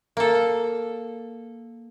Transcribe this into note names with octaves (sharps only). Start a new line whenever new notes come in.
A#3 A4